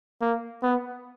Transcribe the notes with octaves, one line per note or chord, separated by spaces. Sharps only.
A#3
B3